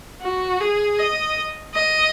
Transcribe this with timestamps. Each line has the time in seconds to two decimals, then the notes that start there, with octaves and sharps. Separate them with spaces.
0.22 F#4
0.61 G#4
0.99 D#5
1.74 D#5